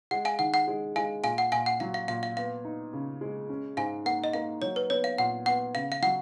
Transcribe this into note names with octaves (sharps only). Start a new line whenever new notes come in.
G#3 F#5
F5 G#5
D#3 F#5
F#5
G#3
G#3 F5 G#5
A#2 F5 G#5
F#5
A#2 F5 G#5
F#5
F#3 F5
F5
A#2 F5
F5
B3 F5
D#4
C#3
G#3
C#4
G#2 F5 G#5
A#3 F#5
D#5
A#3 F5
F#3 C#5
B4
B3 C#5
F5
A#2 F#5
B3 F#5
C#3 F5
F5
F#3 F#5